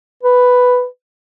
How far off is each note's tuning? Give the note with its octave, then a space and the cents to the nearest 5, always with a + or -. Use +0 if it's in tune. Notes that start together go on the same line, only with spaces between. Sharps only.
B4 +5